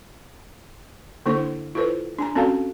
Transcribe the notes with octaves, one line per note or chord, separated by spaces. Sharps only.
D3 A#3 D4 E4 A4 C5
E4 F4 A4 B4 C5
D4 G#5 A#5
C4 C#4 F#4 A4 F5 G5